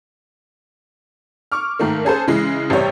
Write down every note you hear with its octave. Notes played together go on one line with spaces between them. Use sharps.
C#6 D6 F6
G#2 D#3 A3 A#3
C#4 G#4 A4 C5
C#3 E3 G#3
A1 C3 G3 G4 C#5